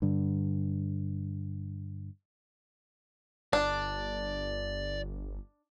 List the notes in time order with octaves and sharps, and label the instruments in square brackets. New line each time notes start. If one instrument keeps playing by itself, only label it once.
[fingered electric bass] G2 D3
[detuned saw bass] G1 [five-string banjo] D4 [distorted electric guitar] D5